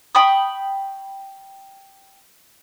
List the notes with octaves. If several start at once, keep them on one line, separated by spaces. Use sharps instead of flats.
G5 B5 C#6 D#6